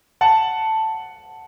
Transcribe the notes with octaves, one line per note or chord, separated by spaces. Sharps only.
F#5 A5